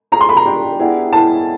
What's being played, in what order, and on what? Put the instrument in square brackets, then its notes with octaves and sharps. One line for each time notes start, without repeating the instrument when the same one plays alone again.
[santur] C#4 F4 G#4 [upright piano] A#5
[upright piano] C6
B5
A#5
[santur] D4 G4 A#4
G3 B3 E4 G#4
[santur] C#4 E4 G#4 B4 [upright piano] A5